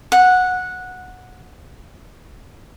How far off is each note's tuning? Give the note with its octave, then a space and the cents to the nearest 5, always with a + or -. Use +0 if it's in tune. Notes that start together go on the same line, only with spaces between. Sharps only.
F#5 -10